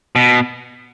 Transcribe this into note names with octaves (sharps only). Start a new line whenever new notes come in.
B2